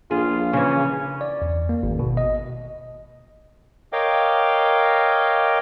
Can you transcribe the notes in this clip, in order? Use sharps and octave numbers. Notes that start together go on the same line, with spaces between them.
A#1 F4 G#4
C#3 E3 C#4
D5
E2
A#3
G#1
B2
D#5
A#4 C#5 D#5 F5 G5 D6